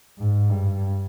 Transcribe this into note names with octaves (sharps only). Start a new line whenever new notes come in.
G#2
G2